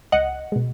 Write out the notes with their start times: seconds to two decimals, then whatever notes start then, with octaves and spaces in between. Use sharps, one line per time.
0.12 C#2 D#5 F#5
0.52 B2 G#3